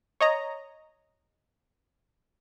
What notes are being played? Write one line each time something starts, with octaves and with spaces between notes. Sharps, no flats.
C#5 D#5 A#5